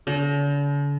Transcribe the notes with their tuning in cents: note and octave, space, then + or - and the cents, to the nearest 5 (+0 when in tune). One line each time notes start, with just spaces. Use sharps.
D3 -45